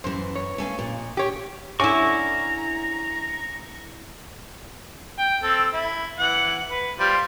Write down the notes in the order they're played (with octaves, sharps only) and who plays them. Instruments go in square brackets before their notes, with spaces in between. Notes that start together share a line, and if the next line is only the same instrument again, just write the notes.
[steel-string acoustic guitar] F#2 E3 [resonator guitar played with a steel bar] C5
[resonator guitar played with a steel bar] C#5
[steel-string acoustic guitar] A3 C#4 F5
F2 A#2
[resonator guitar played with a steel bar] G4 C#5
[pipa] D3 C#4 [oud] E4 D5 [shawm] A#5 [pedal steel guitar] C#6
[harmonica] G5
C4 A4
E4
E3 F#5
B4
G3 F4 C5